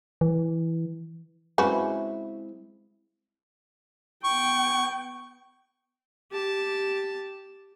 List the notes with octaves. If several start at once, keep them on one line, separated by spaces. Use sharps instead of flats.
E3
C#3 G#3 C4 E4 F#4 B4
B3 G5 C#6
G4 A5